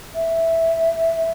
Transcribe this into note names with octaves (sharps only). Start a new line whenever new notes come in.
E5